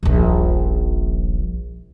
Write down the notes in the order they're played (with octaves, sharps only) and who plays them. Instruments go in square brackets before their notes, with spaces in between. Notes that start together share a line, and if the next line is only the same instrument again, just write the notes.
[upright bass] D#1 A#1